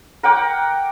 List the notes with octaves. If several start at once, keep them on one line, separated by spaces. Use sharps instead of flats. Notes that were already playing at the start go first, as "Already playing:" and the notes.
A#4 F#5 G5 D6